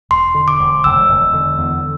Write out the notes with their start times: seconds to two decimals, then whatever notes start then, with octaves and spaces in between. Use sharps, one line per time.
0.11 E1 C6
0.34 D3
0.48 D6
0.60 E1
0.84 E1 E6
1.09 E1
1.34 D3
1.58 E2